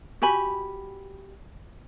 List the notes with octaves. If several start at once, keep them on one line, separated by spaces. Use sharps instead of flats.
F#4 G4 G#5 B5